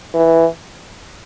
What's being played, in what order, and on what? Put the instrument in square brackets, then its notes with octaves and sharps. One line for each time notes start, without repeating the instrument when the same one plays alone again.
[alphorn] E3